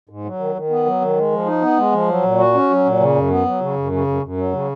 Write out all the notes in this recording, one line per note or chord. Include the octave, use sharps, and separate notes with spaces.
G#2
F#3
D#3
D#3
B3
F#3
D#3
G#3
F3
D#4
B3
G#3
F3
F#3
A#2
F#4
C#4
F#3
A#2
C#3
F#2
B3
F#3
C#3
F#2
C#3
F#2
F#2
F#3
C#3